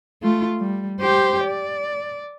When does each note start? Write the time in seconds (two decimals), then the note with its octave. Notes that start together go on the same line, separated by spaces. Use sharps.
0.22 A3 F4
0.60 G3
1.01 G4 C5
1.45 D5